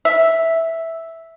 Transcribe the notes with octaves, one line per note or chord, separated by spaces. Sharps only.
E5